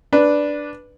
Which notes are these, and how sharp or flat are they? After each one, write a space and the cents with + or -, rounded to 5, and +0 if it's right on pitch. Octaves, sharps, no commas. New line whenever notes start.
D4 +0 B4 -5